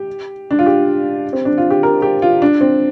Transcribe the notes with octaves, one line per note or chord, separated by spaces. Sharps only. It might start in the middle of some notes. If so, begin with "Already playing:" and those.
Already playing: G4
D4
F4
G4
C4
D4
F4
G4
A#4
G4
F4
D4
C4